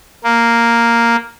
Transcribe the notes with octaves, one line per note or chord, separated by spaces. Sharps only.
A#3